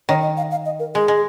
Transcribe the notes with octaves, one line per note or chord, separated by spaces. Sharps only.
D#3 C#5
D#5
F5
F5
D#5
A#4
G#3 G#4
G#3